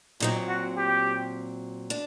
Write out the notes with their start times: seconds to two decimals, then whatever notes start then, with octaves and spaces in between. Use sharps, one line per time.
0.20 A#2 F#3 C4 D#4
0.48 F#4
0.77 G4
1.90 D4